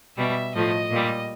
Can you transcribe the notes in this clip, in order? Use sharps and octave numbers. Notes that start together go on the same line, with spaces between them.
B2 G3 E5
A2 F3 A3 D#5
A#2 G3